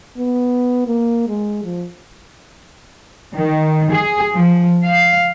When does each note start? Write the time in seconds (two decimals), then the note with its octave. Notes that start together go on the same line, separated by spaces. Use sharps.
0.18 B3
0.87 A#3
1.28 G#3
1.64 F3
3.33 D#3
3.89 G#4
4.33 F3
4.83 F5